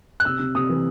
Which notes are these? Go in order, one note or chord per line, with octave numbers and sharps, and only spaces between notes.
F#6
C3 E6
C3
C3 D#6
E3